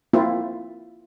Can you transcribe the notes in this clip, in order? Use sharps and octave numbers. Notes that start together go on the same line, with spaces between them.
A#3 C4 E4 F4